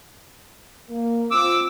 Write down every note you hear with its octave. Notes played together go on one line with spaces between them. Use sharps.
A#3
C4 F4 D6 E6